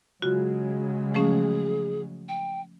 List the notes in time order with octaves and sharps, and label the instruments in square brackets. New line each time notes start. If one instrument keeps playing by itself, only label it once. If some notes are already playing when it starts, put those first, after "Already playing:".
[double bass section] C#3 F#3 G#3 [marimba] F4 F#4
[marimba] F3 A3 C#4 [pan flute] G#4
[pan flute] G5